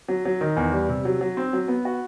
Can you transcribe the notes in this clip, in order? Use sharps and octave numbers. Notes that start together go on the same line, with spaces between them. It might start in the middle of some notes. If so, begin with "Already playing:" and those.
F#3
F#3
D#3
E2
G3
C3
F#3
F#3
C4
F#3
B3
F#4